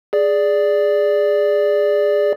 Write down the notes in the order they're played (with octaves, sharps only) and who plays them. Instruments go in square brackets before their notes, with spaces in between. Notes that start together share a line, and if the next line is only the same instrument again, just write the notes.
[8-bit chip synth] G#4 D5